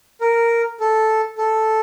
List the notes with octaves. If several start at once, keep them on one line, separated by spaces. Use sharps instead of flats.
A#4
A4
A4